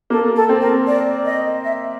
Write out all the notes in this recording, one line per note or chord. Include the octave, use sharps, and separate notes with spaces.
A#3 A4
A4
C4
A#4
D5
D#5
E5